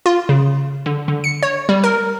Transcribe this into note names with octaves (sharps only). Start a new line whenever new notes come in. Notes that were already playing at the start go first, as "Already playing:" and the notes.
F4
C#3
D3
D3
C#7
C#5
G3
A#4